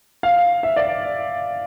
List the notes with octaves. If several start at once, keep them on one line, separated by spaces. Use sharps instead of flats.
F5
E5
D5